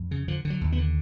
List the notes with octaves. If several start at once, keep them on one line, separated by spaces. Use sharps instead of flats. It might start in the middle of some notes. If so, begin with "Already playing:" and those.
Already playing: F2
C#3
D3 F3
D3
F#3
D#2
B3
D3